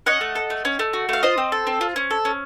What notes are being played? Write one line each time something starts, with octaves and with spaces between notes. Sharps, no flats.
C#4 D#5 F#5
A3
A4
A3
C#4
A3
F#4
A3 F5
F4 C5 D#5
C4
A4
C4
F4
C#4
A4
C#4